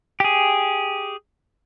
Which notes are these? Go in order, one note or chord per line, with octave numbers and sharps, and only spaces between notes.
G4 G#4